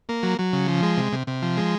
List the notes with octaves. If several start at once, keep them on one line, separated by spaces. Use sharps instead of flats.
A#3
F#3
F#3
C#3
F3
G#3
C3
C3
C3
F3
G#3